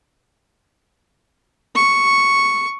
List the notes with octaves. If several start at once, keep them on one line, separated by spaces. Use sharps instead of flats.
C#6